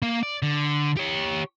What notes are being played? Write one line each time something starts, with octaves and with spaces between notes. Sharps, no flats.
A#3 F5
D5
D3
G4 C#5